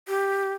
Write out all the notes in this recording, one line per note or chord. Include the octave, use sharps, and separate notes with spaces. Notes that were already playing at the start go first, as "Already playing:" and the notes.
G4